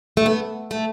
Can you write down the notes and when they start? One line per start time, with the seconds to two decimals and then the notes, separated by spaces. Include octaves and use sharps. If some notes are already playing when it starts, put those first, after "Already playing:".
0.17 A3
0.26 B3
0.71 A3